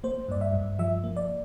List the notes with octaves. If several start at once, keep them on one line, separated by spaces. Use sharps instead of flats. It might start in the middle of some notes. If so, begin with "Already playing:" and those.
A#3 C5
G2 D5
E5
G2
F3 E5
A#3
D5